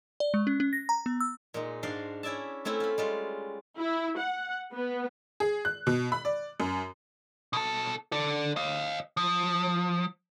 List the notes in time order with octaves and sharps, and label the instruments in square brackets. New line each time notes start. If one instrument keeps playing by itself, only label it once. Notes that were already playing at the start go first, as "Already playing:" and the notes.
[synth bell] D5
G#3
C#4
C#4
A#6
A#5
B3
E6
[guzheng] A#2 G#3 D#4
G#2 D4 F#4 D5 F5 C6
C#4 E4 D5 E5 A5
A3 C4 C#4 E4
F4 B5
G3 G#3 F4
[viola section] E4
F#5
B3
[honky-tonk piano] G#4
F#6
B2
B5
D5
F#2
[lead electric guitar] B2 A4
A4 D5
D#5 F5
F3